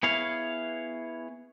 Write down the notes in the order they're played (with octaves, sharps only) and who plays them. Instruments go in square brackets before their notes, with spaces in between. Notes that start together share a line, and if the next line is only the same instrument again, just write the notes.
[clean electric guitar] B3 E4 G#4 C#5 F5